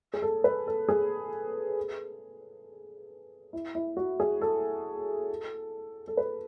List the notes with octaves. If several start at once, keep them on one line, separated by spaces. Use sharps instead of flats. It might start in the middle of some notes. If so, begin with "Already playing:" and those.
G#4
A4
B4
A4
G#4
E4
E4
F#4
G#4
A4
A4
B4